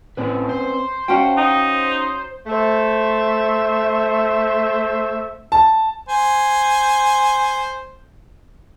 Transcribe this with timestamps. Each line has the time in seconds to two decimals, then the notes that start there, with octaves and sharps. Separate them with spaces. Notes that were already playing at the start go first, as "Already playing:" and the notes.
0.17 A2 C4 C#4 B4
0.49 C5
1.08 C#4 F#4 C5 F5 G5
1.37 D#4
2.47 A3 C5 E5
5.52 A5
6.08 C5 G#5